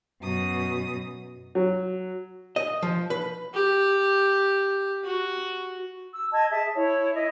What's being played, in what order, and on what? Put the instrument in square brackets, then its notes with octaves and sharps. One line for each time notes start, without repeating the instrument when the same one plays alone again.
[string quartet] F#2 B2 D#6
[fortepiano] F#3
[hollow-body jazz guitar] D#5
F3
B4
[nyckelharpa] G4
F#4
[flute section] E6
D#5 A5 G#6
G#4 E5 A5
E4 C#5
E4 D#5 E5